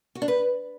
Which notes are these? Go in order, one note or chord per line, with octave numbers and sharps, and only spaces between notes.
F#4
D4
B4